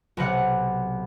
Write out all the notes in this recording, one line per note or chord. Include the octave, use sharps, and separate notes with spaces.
B1 C3 F#5 F#6